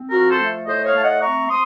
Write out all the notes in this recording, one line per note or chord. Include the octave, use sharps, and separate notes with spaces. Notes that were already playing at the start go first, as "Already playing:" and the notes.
Already playing: C4
F3 F#4 A#4
A4 C5
A3
A2 C5 D#5
C#5 F5
A3 A5
D#5 F#5
C4 A#5 C#6
C4 C6 D#6